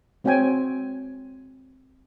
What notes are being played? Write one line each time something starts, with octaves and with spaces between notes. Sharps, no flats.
G#3 C4 F#4 C#5 G5 G#5